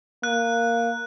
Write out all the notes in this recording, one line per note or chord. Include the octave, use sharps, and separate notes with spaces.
A#3 F#6